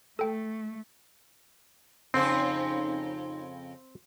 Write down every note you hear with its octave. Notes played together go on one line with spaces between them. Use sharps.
A3 A4 G5
F2 C#3 C4 D#4 C5